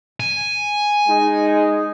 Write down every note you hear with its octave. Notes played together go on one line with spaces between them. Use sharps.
G#5
G#3 D#4